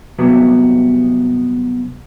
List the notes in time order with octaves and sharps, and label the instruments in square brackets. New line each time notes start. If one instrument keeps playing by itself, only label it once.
[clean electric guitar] G2 C3 F#3 B3